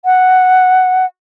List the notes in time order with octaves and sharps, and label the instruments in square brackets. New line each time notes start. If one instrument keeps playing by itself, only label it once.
[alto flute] F#5